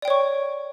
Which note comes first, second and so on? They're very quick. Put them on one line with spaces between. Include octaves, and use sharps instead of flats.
D5 G5 C#5 C#6